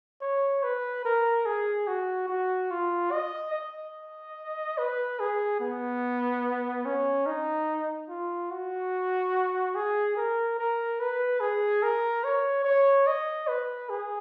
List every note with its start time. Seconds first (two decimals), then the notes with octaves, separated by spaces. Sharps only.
0.21 C#5
0.63 B4
1.05 A#4
1.46 G#4
1.87 F#4
2.28 F#4
2.71 F4
3.12 D#5
3.54 D#5
4.78 B4
5.20 G#4
5.60 B3
6.85 C#4
7.26 D#4
8.09 F4
8.51 F#4
9.75 G#4
10.17 A#4
10.58 A#4
11.00 B4
11.40 G#4
11.83 A#4
12.24 C#5
12.64 C#5
13.07 D#5
13.48 B4
13.89 G#4